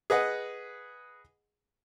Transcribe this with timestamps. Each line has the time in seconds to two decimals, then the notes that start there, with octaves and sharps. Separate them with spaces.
0.10 G#4 B4 D#5 F#5